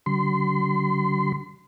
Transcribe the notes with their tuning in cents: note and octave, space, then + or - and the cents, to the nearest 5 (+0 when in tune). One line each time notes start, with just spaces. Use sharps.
D3 -30 F#3 +40 C6 -30